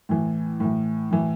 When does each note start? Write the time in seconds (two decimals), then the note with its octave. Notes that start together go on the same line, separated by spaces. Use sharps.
0.09 A2 E3
0.60 A2 E3
1.11 A2 E3